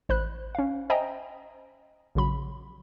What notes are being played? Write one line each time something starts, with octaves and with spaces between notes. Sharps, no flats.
A1 C5 B5 F#6
C#4 F5
C5 D#5 E5 G5 G#5 A#5
A#1 C#3 F#3 B5